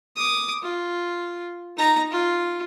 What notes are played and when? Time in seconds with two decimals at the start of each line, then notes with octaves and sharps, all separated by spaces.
0.16 D6 D#6
0.63 F4
1.77 D#4 A#5
2.12 F4